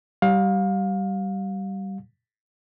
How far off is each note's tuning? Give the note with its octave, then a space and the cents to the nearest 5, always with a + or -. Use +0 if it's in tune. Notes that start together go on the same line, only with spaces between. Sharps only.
G3 -15 F5 +25